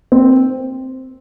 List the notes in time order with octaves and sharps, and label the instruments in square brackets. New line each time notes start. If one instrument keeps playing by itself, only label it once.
[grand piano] C4